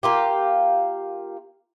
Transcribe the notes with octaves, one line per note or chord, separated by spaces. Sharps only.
A#3 F4 G4